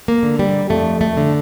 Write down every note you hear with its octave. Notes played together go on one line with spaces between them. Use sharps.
A#3
D3
G3
F2 A3
A3
D3